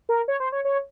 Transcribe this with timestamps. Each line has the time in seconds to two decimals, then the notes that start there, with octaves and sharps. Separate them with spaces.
0.09 A#4
0.28 C#5
0.40 C5
0.52 C#5
0.65 C#5